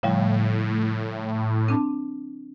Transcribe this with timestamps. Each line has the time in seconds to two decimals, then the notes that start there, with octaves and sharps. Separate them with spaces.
0.03 A2 C#3 F3 G3
1.68 C4 D4 A5